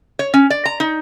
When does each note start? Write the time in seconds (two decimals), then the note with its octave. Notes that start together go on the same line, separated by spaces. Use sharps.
0.19 C#5
0.34 C#4
0.50 D5
0.65 A#5
0.80 D#4